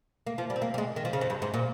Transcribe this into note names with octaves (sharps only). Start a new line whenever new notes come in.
A#3
F3
G3
C4
A#3
G3
G#3
D#3
F3
C#3
F2
G2
G#2
A#2